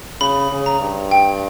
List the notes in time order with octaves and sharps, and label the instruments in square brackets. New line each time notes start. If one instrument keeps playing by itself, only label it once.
[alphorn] C#3 [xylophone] B5
[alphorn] C#3
[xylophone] A#5
[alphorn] G2
[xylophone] G5